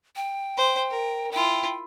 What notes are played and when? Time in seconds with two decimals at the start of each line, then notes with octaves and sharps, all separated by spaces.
0.16 G5
0.57 C5
0.91 A#4
1.32 E4 F4 G5